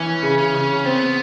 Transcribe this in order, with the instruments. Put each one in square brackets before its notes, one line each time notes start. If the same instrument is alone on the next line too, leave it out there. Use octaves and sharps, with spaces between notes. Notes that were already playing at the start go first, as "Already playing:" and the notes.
Already playing: [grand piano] E3 [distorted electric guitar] C#4
[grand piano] C#3
[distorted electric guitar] C#4
[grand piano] C#3
[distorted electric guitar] B3 [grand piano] C4